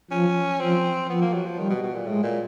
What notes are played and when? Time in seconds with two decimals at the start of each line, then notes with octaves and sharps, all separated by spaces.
0.11 F3 C#4
0.60 F3 C4
1.09 F3 B3
1.21 A#3
1.33 F#3
1.46 F3
1.58 D#3 G3
1.70 B2
1.83 B2
1.94 A#2
2.07 A2 G#3
2.23 A#2